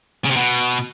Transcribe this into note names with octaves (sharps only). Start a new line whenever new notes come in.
C#3
C3
B2